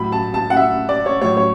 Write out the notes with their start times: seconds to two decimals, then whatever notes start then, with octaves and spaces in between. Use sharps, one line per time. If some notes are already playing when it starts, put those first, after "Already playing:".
Already playing: A2 F#3 B5
0.12 A5
0.34 A5
0.50 F#5
0.56 E5
0.89 D5
1.06 C#5
1.21 A2 F#3 C#5
1.37 C#5